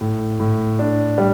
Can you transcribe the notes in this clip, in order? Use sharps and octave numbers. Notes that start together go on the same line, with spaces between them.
A2
A2
D4
G3